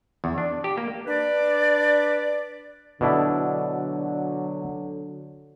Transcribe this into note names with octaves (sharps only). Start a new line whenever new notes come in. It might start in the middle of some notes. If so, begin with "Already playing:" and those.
E2
D4
G4
A#3
D4 B4 D5
B2 D3 F#3 D4 E4